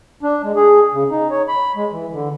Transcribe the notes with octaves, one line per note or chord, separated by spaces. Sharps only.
D4
G#3
G#4
C#3
D#4
C#5
B5
G#3
E3
D3